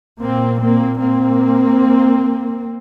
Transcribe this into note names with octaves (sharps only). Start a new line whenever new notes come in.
A#2 A#3 C4
A#3 C4
A#3 C4